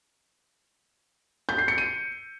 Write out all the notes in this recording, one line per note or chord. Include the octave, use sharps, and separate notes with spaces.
G6
C7
C#7
D#7